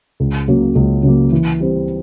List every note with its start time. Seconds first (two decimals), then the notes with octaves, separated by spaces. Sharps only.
0.20 C#2
0.48 C#3 F#3 A#3
0.75 C#2
1.03 C#3 F#3 A#3
1.31 E3
1.60 G3 C4